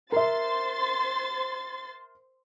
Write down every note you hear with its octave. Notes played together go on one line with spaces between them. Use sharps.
A#4 C5 E5 C6 A6